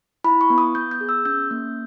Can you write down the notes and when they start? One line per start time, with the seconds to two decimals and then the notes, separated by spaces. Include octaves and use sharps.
0.24 E4 B5
0.41 C#6
0.50 B3
0.58 D#6
0.75 B3 G6
0.91 G6
1.01 G#4
1.09 E6
1.25 C#4 G6
1.51 A#3